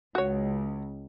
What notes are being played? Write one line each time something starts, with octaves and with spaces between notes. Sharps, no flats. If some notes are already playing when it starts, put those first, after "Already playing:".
C#2 F#4 C#5